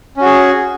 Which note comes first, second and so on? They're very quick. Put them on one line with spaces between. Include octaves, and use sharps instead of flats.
C#4 F#4 G#4